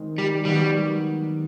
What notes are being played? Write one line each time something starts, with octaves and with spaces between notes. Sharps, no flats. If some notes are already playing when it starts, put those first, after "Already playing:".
Already playing: D#3 G#3 C4
G3
D#3 F#3 G3 B3 D#4 F#4